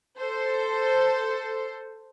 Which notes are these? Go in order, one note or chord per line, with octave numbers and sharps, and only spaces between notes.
A4 C5